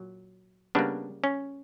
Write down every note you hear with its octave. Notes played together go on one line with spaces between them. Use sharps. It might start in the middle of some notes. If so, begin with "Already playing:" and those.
Already playing: A#2 F#3
C#3 G3 A#3 B3 D4
C#4